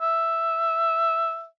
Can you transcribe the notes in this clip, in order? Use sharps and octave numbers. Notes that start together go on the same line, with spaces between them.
E5